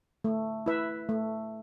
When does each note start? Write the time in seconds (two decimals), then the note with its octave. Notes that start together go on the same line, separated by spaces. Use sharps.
0.24 A3
0.66 E4 B4 E5
1.09 A3